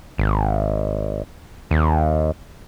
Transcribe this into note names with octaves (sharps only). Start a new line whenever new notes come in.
G#1
D#2